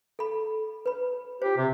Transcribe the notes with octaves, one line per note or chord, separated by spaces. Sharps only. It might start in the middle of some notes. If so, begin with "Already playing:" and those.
A4 B5
B4 B5
F4 G4 C5
C3